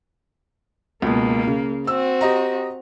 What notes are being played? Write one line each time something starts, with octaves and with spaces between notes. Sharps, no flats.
C#2 B2 A#3
C#3
C4 F#4 E6
G4 D#5 A#5